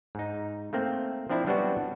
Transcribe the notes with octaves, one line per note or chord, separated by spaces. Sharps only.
G#2 D#4
A3 A#3 C4
F3 C4 D4 E4
F#3 G3 B3 C4 D4 F#4